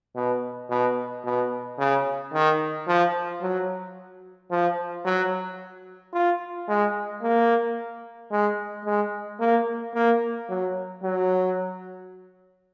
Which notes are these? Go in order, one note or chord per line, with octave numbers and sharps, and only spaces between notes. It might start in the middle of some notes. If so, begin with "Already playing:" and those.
B2
B2
B2
C#3
D#3
F3
F#3
F3
F#3
F4
G#3
A#3
G#3
G#3
A#3
A#3
F#3
F#3